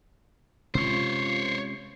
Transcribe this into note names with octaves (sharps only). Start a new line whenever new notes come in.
C3 G#3 C#4 F4 C5 C#5 C7